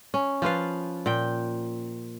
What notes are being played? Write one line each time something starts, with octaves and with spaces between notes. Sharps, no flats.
C#4
F3 F4 B4 F5
A#2 G5